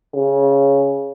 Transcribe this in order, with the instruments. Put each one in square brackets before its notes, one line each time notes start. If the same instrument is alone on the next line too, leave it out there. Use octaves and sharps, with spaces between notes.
[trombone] C#3